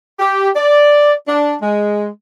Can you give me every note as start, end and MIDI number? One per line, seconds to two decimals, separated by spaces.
0.20 0.49 67
0.56 1.13 74
1.28 1.55 62
1.62 2.08 56